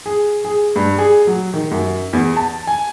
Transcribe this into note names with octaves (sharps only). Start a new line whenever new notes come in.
G#4
G#4
G2
G#4
F#3
D#3
F#2
E2
A5
G#5